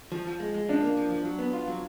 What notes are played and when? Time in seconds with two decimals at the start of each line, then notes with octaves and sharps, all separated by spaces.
0.12 F3
0.27 F3
0.40 G#3
0.54 G#3
0.69 F3 D4
0.82 A#3
0.97 F3
1.10 F3
1.25 F#3
1.39 B3
1.53 F4
1.68 F#3